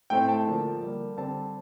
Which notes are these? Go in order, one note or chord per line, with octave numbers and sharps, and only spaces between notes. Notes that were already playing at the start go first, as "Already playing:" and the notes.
A2 A3 C4 G5
A5
D3 F3 A#3
D3 G3 A#3
D3 G3 C4 A5